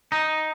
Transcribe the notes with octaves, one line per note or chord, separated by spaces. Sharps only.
D#4